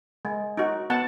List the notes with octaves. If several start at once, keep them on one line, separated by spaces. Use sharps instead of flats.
G#3
D#4 F#4
B3 F#5 A5